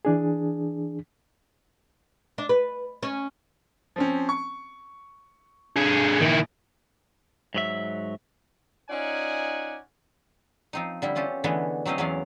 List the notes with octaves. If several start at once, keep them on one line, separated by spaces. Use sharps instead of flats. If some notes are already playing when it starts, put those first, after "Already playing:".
E3 D4 G#4
D4
B4
C#4
F3 C4 C#4
C#6
G2 D3 G#4
A#1 D#3 E4
G#2 F#3 E5
C#4 D#4 F4 D5 F#5 G#5
F3 C4 D#4
D3 G3 E4
B3 C#4 F4 G4 A4
D3 E3 G#3 A3 B3
F#3 A3 C4 C#4 D#5 F5
E2 F#3 B3 C#4 D5 F5